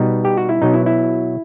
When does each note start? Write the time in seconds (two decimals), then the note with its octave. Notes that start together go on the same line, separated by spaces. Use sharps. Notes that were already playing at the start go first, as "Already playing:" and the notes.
Already playing: B2 G3 B3 D#4
0.25 G4
0.37 F#4
0.49 E4
0.62 B2 F#3 B3 D#4
0.74 E4
0.86 E4